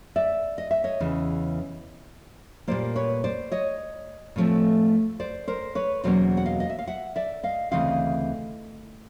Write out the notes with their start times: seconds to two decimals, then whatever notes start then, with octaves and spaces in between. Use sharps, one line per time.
0.16 D5 E5
0.58 D#5
0.71 E5
0.84 C#5 D#5
1.00 E2 C#3 E3
2.68 A#2 G3 A#3 C5 D5
2.96 B4 C#5
3.24 C5 D5
3.52 C#5 D#5
4.36 A2 F3 A3 C4
5.20 C5 D5
5.48 A#4 C5
5.75 B4 C#5
6.04 E2 B2 F#3 A#3 C#4 C5 D5
6.37 F#5
6.46 D#5 F5
6.60 D#5
6.70 E5
6.79 F5
6.87 E5 F#5
7.16 D5 E5
7.43 D#5 F5
7.72 D2 C#3 E3 C4 D#5 F5